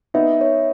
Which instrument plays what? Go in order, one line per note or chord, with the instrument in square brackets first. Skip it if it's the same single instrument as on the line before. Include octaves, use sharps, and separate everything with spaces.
[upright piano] B3 D#4 [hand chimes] E5
[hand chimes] C#5